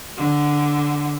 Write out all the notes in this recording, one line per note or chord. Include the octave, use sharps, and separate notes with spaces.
D3